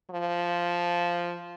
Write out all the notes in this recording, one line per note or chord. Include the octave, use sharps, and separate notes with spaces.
F3